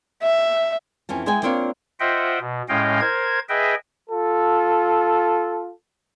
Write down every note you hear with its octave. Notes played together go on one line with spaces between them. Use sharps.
E5
F2 E3 C#4 A5
G#3 B3 G#4 E5 G5 G#5
A#3 C4 D4 F4 C#5 F5
F4 C5 D#5 E5 F#5 G5
B2
A2 G#3 C#4 D#5 F5 G5
A#4 C5 G#6
G#4 B4 D#5 E5 G5
F4 A4